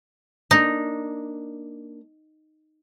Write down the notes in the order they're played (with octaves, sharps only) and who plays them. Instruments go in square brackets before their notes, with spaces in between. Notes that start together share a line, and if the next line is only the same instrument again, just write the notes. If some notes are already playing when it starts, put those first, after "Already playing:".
[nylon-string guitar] A#3 D4 [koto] D#4